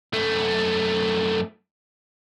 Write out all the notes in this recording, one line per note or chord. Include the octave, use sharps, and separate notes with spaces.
F#2 A3